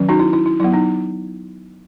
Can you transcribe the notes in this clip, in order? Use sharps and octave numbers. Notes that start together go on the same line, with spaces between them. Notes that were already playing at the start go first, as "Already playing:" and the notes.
Already playing: D#3 F#3 C#4
D#4 F#4
E4
E4
E4
F#3 B3 E4
D#4